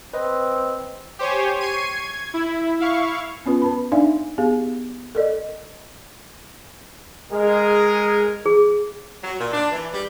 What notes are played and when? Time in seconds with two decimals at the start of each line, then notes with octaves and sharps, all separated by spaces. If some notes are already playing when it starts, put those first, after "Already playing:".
0.13 C4 B4 C5 D#5
1.19 G4 C5 C#5 G#5
1.60 C#6 G#6 C7 D#7
1.93 G#6
2.34 E4
2.80 E4 F5 C#6
3.46 B3 C#4 F4 B4
3.62 B4 A5 B5
3.92 D4 D#4 D5 E5 F5 G#5
4.38 B3 G4 G#4 F5
5.15 A4 A#4 D5 D#5
7.32 G#3 G#4 A#4
8.46 G#4
9.24 F#3
9.40 A#2
9.53 D4
9.72 E3
9.94 G3